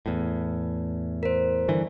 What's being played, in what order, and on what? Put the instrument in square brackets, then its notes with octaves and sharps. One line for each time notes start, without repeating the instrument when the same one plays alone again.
[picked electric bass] E2 A2
[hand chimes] A#4 C5
[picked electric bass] G2 D3 E3